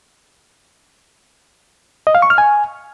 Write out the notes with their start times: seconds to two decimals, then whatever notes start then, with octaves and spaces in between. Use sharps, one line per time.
2.07 D#5
2.15 F5
2.22 C#6
2.30 F6
2.38 G#5